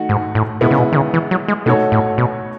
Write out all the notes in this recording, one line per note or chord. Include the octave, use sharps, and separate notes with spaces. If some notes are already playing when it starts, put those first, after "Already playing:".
Already playing: D#3 A3 D#4 F#4
G#2
A2
B2 G#3 B3 E4
C#3
B2
D#3
C#3
E3
F#3
G#3
B2 A3 D#4 F#4 A4 C#5
A2
B2